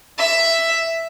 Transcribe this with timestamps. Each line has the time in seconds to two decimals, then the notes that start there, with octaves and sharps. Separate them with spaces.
0.19 E5